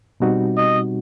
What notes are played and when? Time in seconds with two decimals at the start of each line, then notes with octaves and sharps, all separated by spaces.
0.20 B2 G3 C4 D#4 F#4
0.57 D#5